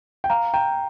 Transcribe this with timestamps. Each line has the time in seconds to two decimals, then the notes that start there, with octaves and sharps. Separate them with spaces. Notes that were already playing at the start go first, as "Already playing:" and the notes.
0.24 G5
0.30 F5 A#5
0.54 G5 A#5